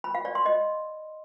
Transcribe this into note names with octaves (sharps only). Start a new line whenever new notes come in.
B5
F5
D5
C6
D#5